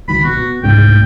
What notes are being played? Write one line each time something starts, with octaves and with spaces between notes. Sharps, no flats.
C#2 D#3 F#3 B5
B1 B2 F#4
B2
C2 G#2 C#3 G5
G1 D2